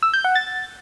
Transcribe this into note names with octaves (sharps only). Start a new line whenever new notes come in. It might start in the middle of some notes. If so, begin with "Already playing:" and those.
E6
G6
F#5
A6